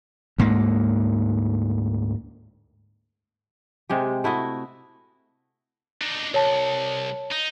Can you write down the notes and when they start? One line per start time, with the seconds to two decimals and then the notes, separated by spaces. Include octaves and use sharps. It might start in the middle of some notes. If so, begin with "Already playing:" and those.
0.38 D2 G#2 A#3
3.89 C3 G#3 G4
4.24 A3 E4 F#4 D#5
6.02 D4 D#4
6.34 C2 C#5 A5
7.31 D#4